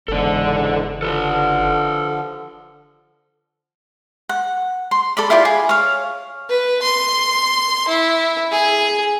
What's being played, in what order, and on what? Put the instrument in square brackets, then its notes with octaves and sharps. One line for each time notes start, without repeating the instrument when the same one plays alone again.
[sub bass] F#1 [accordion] E2 G#2 [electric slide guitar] D4 A4
[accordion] D3 F3 [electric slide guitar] A4 B4
[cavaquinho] F#5
C6
A4 D5 B5
E4 F4 G4 D5
G#4
C#5 F5
[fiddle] B4
C6
E4
G#4